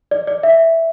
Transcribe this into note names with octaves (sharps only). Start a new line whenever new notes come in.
D5
D5
E5